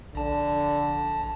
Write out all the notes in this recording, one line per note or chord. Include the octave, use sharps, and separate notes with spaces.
A#1 D3 A5